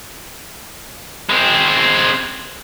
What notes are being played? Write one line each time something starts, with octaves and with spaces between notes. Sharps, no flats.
G#3 C4